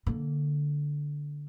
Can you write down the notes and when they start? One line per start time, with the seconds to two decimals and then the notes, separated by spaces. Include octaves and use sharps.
0.07 D3 A#3